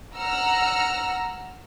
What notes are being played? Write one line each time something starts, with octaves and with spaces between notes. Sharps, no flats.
F#5 A#5 E6 F6